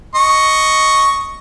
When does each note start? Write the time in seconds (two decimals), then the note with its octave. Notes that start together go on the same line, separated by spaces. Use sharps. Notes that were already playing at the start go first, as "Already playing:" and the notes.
0.15 D#5 C#6